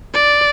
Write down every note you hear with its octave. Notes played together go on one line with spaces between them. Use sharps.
D5